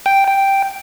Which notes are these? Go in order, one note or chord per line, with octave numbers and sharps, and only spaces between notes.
G5
G5